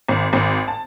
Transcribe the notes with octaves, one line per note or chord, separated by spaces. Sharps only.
G#1
G#1
A5